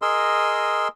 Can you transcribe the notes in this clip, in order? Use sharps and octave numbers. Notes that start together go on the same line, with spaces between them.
G#4 A#4 D#5 C6 E6